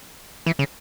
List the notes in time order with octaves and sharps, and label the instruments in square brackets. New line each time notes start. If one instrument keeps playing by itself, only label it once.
[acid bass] E3
C#3